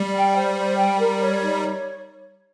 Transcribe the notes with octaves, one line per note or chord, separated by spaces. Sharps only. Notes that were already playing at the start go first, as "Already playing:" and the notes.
Already playing: G3
G5
C5
C5
G5
A#4
C#5
D#4
C#5